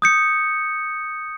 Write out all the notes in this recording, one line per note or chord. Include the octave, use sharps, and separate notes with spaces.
D#6 G6 C#7